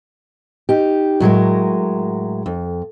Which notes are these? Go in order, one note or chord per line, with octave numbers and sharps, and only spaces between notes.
D#4 G4
A2 F#3 G#3 A#4
F2